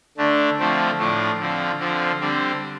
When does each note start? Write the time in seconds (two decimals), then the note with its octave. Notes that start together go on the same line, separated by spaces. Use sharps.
0.17 D3 A3 D4
0.59 D3 F3 A3 C4
0.98 A2 F3 A3 D4
1.40 D3 F3 C4
1.79 D3 F3 C4
2.20 D3 G3 C4